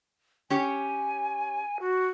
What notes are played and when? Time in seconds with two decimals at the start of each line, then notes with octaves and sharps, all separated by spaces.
0.50 C#4 G4 C#5 G#5
1.80 F#4